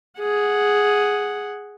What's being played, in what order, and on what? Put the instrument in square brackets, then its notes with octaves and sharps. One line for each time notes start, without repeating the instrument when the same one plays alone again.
[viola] G#4 F#5